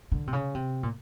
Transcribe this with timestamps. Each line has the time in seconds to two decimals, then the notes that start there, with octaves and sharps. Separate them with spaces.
0.12 D3
0.27 C3
0.33 C#3
0.55 C3
0.83 A#2